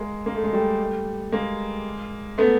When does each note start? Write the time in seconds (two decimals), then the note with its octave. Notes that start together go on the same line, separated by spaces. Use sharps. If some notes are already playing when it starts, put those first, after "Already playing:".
Already playing: G#3 A#3
0.26 A#3
0.35 A3
0.44 G#3
0.53 G3 A3
1.32 G#3 A#3
2.38 A3 B3